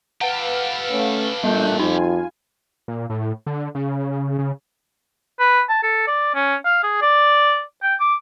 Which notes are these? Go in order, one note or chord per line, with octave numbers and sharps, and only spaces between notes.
G4 A4 B4 F5 F#5 E7
A3 C#4
A1 A#2 G3 A3 D4 F#6 G6
F2 D#4 F4 G#5
A#2
A2
D3
C#3
C#3
B4
A5
A4
D5
C#4
F5
G#4
D5
G5
D6